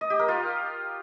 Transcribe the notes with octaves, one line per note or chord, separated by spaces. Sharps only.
D#5
G4
A#4
F4